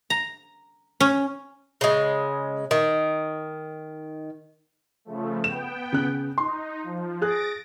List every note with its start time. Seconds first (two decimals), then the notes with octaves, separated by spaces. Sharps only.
0.10 A#5
1.00 C#4
1.81 C#3 G#3
2.71 D#3
5.05 C#3 F3 A3
5.44 B3 G5 E7
5.93 C#3 F#6
6.38 D#4 C6
6.83 F3
7.22 G#4 F#6 A6 A#6 D7